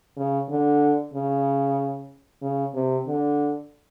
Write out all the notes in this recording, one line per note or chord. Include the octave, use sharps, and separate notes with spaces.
C#3
D3
C#3
C#3
C3
D3